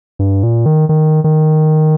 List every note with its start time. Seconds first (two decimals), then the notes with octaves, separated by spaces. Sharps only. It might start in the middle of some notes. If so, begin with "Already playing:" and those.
0.19 G2
0.43 A#2
0.66 D#3
0.89 D#3
1.24 D#3